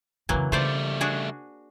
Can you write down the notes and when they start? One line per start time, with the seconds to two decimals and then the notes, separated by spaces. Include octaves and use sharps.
0.29 F2 C#3 E3 F#3 A#3
0.52 C#3 G3 A3 F4 C5 D5
1.01 D4 F#4 G#4